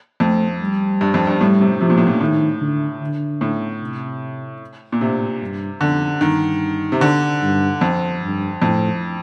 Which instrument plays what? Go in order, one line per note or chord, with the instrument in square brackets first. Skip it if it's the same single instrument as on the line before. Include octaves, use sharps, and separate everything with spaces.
[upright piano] F2 [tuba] A3
[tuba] G3
[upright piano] G2
F2
G2
[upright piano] A2 [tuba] G3
[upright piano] C3
[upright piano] C3 [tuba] F3
[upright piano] A#2
A2
A#2
[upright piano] A2 [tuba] D#3
[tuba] D3
D3
[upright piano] A2
[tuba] C3
[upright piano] A#2
[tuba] A2 [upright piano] C3
[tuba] G2
[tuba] F2 [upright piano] D3
[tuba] G2 [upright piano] D#3
[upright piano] C3
D3
[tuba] G2
[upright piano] F2
[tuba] G2
[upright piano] F2 [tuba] A2